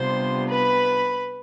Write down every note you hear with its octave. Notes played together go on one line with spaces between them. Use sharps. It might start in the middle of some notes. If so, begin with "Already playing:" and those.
Already playing: C3 G3 B3 D4 F4 C5 C6
B4 B5